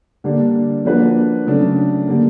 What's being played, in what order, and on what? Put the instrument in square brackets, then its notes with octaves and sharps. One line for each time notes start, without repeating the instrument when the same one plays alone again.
[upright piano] D3 G3 A#3 D4
F3 A#3 D4 F#4 B4
C#3 F#3 A3 D4
D3 G3 A#3